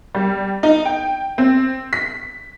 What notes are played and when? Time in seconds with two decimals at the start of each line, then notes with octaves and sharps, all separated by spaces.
0.15 G3
0.63 D#4
0.85 G5
1.38 C4
1.93 B6